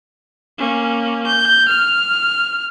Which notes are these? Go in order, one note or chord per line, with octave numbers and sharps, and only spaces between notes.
A#3 C#4
G6
F6